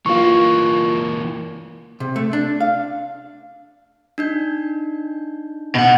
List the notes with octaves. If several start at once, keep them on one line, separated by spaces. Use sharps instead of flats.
E3 A#3 F4 C#6
C3
A3
D4
F5
D4 D#4 G6
B2 F#5